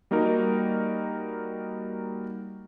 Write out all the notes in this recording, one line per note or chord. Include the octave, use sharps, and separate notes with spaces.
G3 A#3 D#4 F#4 A#4